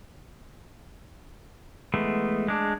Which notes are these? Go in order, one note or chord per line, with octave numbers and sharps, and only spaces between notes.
E3 G#3 A3 B3
G#3 D4